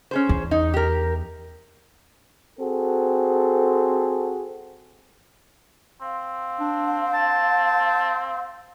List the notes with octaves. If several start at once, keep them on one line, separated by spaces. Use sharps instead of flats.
C#4 G#4 C5
E2
D#4
G4 A#4
C4 F#4 G#4 A4
C4 F5
D4
A5